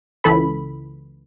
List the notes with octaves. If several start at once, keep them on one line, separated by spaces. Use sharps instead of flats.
C#2 E3 A4 B5